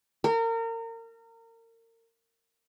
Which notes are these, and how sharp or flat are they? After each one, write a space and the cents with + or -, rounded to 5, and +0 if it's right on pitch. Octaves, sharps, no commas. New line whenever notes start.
A#4 -30